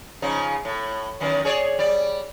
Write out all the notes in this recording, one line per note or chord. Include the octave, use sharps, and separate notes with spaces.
C#3 F3 D#4
A2
F#2 D#3 E3
G#4 C#5 D5
G3 D5